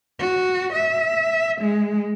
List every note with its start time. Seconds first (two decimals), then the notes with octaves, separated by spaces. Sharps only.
0.20 F#4
0.73 E5
1.61 G#3